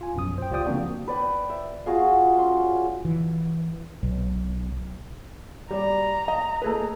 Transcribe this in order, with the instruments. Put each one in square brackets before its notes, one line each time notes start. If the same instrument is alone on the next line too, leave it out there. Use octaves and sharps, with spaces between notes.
[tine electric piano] F4 G#5
A#1 F#2 B2 D#6
C5 G5
C#2 F4 G4 D5 G5 D#6
C#3 F3 A#3 C4 D4 F#4
[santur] B4 D5 G5 B5
E5
F4 F#4 G#4 F5
C#4 C6
[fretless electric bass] E3
B1
[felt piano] G3 D5 [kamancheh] A#5
[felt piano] D#5
A3 G#4 B4